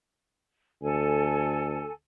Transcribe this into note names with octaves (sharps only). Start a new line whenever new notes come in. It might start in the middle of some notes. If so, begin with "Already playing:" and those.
D2 A4 G#5